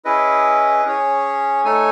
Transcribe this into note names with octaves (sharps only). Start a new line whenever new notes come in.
C#4 E4 G#4 B4 D#5
C#4 G#4 C#5
A3 D#4 A4 C#5 G#5